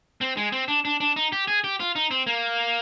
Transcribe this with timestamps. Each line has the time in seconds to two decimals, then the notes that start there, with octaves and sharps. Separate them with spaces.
0.21 C4
0.37 G#3
0.52 C4
0.68 D4
0.85 D4
1.00 D4
1.16 D#4
1.32 G4
1.48 G#4
1.64 G4
1.80 F4
1.96 D#4
2.11 C4
2.27 A#3